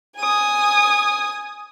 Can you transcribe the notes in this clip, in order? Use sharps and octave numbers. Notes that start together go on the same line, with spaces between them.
G#5 D#6